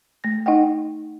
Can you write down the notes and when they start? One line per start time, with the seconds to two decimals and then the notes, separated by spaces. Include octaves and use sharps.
0.24 A3 A#6
0.46 D#4 D#5 F#5 G5